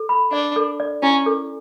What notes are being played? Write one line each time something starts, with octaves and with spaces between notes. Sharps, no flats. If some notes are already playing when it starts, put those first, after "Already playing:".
Already playing: A4
B5
D4 D5
A4
D5
C#4 E4
A4